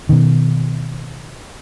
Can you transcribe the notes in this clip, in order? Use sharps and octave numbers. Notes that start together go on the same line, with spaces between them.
B2 D#3